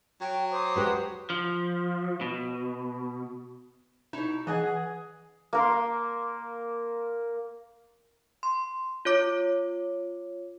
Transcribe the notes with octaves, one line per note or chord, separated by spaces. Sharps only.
F#3 G5
C5 D6 D#6
G#3 F#4 G4 B4
F3
B2
B2 D#4 E4
E3 G#4 D#5 F#5 G#5
A#3 A#4 C6
C6
F4 C#5 D6